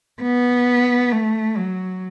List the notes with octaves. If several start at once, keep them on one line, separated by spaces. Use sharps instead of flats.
B3
A3
F#3